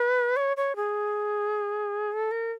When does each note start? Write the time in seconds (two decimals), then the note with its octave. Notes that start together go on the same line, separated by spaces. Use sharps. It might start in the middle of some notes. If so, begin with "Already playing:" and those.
Already playing: B4
0.36 C#5
0.57 C#5
0.76 G#4
2.13 A4
2.31 A#4